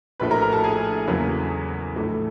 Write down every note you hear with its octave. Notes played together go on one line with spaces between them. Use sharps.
A#1 A2 F3 A3 B4 B5
A#4 A#5
A#4 A#5
A4 A5
G#4 G#5
E2 C#3 F#3 A#3
A#1 A2 E3 A3